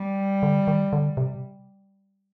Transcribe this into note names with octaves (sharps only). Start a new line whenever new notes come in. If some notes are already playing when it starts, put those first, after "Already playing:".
Already playing: G3
D3
D#3
D3
C3